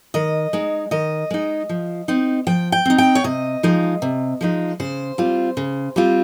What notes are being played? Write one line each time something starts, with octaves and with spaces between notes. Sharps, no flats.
D#3 D#5
G#3 D#4
D#3 D#5
G#3 D#4
F3
C4 D#4
F3 G5
G5
C4 D#4
G5
C#5
C3 D#5
F3 G#3 D#4
C3
F3 G#3 D#4
C#3 C5
G3 C4 F4
C#3
G3 C4 F4